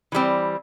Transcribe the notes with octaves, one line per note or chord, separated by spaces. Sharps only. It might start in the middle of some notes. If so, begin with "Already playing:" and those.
E3 G3 C4